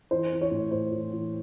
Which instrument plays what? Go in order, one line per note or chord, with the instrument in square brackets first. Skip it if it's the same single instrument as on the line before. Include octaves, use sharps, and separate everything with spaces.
[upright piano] E3 C5
E3
C#5
A2
A2 C5
E3
E3